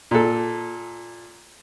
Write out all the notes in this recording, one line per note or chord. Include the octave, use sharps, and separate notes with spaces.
A#2 A4